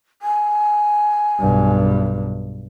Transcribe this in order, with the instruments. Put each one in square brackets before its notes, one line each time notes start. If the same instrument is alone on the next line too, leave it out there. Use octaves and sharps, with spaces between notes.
[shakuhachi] G#5
[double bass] B1 G2